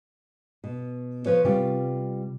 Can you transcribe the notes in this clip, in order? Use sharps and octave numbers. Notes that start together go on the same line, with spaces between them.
B2
F3 B4 C#5
C3 G3 F4